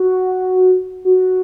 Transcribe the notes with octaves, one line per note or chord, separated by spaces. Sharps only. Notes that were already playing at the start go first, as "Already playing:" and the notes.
Already playing: F#4
F#4